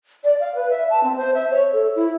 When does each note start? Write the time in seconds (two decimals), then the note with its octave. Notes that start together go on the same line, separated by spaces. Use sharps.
0.24 D5
0.40 F5
0.55 B4
0.70 E5
0.90 A5
1.03 C4
1.17 C5
1.34 E5
1.50 C#5
1.73 A4
1.96 E4